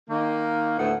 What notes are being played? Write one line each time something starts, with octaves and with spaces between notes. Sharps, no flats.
D#3 A#3
D2 A2 A3 B3 F#5